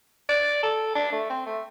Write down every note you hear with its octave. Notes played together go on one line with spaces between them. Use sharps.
D5
A4
D4
A3
C4
A3